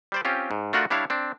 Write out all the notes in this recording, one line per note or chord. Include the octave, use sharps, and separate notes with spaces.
G3 C5 D5
C4 C#4 F4 G4
G#2
A3 D4 F4 F#4 A#4 F#5
G3 D4 E4 C#5 F5
C4 D4